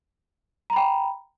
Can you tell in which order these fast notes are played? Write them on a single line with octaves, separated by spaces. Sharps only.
A#5 B5 G5